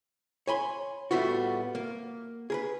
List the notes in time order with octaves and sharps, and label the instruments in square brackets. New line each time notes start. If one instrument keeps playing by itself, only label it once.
[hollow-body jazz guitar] C#5 G#5 B5 C6
A2 G3 A3 B3 F4 F#4
A#3
G#4 A#4 B4